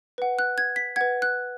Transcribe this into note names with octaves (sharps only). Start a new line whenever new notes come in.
B4 F#5
F#6
G#6
B6
B4 F#5 G#6
F#6